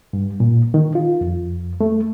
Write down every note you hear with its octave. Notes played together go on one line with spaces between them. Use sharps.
G2
A#2
D#3
F4
F2
A3